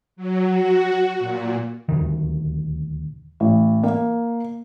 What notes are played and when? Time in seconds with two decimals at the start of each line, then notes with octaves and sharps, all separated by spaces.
0.16 F#3
0.50 F#4
1.19 A#2
1.89 D#1 D2 D#3
3.40 A1
3.84 A#3